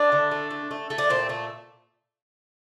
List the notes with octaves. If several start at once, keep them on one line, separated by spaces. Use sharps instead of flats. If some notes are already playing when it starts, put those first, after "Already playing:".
Already playing: A3 D4
D3
A3
A3
A3
A3
D4
A#2 C4
A3